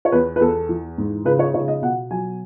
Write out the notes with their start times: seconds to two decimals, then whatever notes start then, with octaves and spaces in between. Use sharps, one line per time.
0.05 C#5
0.12 E2 B4
0.36 B4
0.40 E2 A4
0.69 E3
0.98 G#2
1.25 C#3 B4
1.39 C#5
1.54 C#3 C#5
1.68 D#5
1.82 B2 F#5
2.11 F#3 G#5